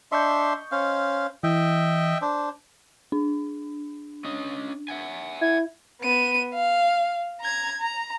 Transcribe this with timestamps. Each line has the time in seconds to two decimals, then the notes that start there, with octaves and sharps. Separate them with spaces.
0.12 D4 D#5 E5 C6 C#6 G6
0.72 C#4 C5 F5
1.43 E3 D#5 E5 G5
2.22 D4 C5
3.12 D4
4.25 C#4 D#5
4.88 E5 F#5 G#5
5.41 E4 G#6
6.02 B3 D#7
6.54 F5
7.41 A#5 G#6
7.81 A#5